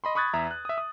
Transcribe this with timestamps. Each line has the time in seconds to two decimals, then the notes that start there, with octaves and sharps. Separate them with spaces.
0.04 D#5 B5 C6
0.15 B5 C#6 D#6 F#6 G#6 A6
0.34 E2 E5 A#5
0.51 F#6
0.65 E5 D#6
0.78 D#6